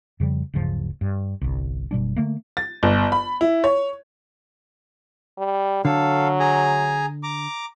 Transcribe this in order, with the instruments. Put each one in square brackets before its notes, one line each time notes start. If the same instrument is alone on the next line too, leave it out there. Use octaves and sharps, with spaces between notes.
[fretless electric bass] F2 C#3 F3 G3
D1 G2 C#3 F3
G2
G1 C2
F#1 B2 G3 D4
D3 A3 A#3
[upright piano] A6
G1
B5
E4
C#5
[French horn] G3
[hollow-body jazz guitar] D3 [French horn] F#3 [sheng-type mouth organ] A4 F5
[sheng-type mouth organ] G#4 G#5 A#5
A#5 D6